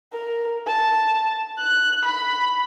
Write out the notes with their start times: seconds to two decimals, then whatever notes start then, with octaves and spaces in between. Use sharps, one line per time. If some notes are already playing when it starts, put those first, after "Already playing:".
0.12 A#4
0.67 A5
1.58 F#6
2.05 B5